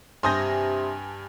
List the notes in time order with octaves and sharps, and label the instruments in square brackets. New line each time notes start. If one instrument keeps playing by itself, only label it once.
[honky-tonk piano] G2 G#5 A#6 [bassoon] C3 [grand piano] C6 D#6 G6